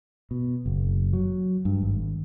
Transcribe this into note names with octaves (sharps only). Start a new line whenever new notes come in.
B2
F#1
F#3
G2
G#1